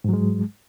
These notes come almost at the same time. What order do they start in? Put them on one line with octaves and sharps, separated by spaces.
G#2 F#3 G#3